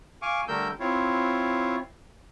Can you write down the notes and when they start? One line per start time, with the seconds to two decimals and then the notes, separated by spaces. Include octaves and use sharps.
0.22 F5 G#5 C#6 D6
0.48 D3 G3 A3 A#4 E6 G6
0.80 C4 E4 F4 C#5